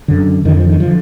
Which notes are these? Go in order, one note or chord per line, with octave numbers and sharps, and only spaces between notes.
F#2 D3
F2 D3 D#3
F3
D#3
F3
D3